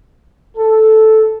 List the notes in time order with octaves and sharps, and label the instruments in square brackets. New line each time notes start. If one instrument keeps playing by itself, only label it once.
[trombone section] A4